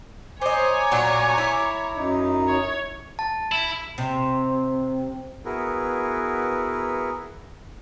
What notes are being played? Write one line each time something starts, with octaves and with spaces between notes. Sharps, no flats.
C5 C#5 D#5 G#5 A#5 D6
A#2 F#3 D4
E4
F#2 D#4
C#5
A5
E4
C3
B3 E4 F#4 G#4 A#4 B4